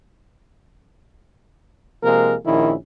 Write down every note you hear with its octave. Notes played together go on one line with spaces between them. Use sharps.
C3 F3 G#3 A#3 A#4
A#1 D#3 C#4 E4